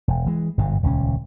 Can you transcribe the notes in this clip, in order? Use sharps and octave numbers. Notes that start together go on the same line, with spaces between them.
E1
E3 G#3
G1 G#2 B2
D#1 C#2 B2 C#4